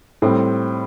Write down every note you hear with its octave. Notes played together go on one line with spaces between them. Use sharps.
A2 G3 C4